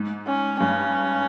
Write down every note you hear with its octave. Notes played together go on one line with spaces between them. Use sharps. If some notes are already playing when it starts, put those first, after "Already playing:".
Already playing: G#2
C#4
G2 C#4